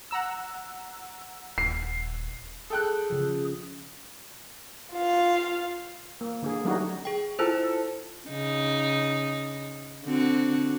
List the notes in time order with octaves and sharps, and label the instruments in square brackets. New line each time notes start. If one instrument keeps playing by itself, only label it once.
[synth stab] F#5 A#5 E6
[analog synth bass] D#1 [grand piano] C7
[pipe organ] G#4 [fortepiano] A4 G5 F#6
[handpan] C#3 F3
[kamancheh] F4 F5
[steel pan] A#3
D3 A#3 G#4
F#3 G3 A3 C#4 D#4 F#4
[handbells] G#4 G5
[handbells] E4 F4 C5 [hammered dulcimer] A4
[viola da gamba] C#3 D#4
D3 C4 F#4